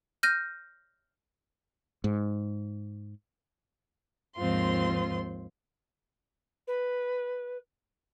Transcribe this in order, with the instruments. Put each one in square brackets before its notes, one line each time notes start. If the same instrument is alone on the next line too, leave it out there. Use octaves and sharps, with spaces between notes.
[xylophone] F6 G6 A#6 D#7
[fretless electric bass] G#2
[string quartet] D#2 G#2 F3 C4 F4 C6
[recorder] B4